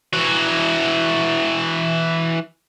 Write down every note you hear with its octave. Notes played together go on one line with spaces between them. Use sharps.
E3 F#4